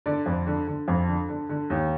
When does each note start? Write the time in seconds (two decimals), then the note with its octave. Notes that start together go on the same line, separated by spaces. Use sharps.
0.06 D3 D5
0.26 F2
0.47 D3
0.67 D3
0.88 F2
1.08 D3
1.29 D3
1.49 D3
1.70 D#2